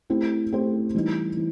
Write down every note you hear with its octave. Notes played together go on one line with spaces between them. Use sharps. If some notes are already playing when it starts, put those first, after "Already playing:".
A3 C4 E4 G4 C5
A3 C4 E4 G4 C5
E3 G3 D#4
E3